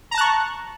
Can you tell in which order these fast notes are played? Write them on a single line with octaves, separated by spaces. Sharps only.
A#5 A5 F#6 C#6